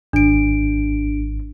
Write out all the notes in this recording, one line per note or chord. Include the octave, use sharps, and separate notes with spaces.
G#1 D4 D7